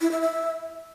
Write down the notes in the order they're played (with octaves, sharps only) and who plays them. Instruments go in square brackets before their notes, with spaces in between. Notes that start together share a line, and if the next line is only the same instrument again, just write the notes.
[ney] E4
E5
E5